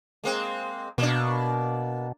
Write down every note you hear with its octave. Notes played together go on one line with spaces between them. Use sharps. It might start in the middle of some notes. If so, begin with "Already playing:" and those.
G#3 A#3 C4
B2 A#3 D4